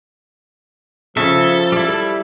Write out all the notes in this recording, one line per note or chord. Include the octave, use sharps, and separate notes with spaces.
C#3 F3 A4 E5
G3 E4